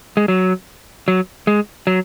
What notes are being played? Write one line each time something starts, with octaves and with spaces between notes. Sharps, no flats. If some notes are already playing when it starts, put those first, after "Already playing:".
G#3
F#3
F#3
G#3
F#3